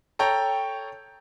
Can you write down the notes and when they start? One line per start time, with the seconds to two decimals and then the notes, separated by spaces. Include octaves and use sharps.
0.19 A4 C#5 G5 A#5